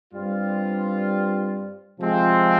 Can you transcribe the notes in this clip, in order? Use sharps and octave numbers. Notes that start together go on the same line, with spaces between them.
G2 G3 C4 F4
C3 F3 G#3 C4 F4